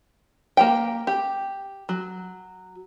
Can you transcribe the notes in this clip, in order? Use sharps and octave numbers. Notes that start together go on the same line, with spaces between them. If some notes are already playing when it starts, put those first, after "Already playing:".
A#3 G4 G5
G4
F#3